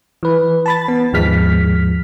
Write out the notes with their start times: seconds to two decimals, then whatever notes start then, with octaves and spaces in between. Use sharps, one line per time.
0.23 E3 B4
0.66 A5 B5 A6
0.88 B3
1.13 D#2 G#2 F3 G#3 F6 B6